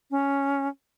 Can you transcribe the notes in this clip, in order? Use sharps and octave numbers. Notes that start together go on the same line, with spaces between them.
C#4